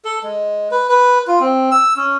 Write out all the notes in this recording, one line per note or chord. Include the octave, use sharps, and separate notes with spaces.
A4
G#3
B4
B4
F4
C4
E6
C#4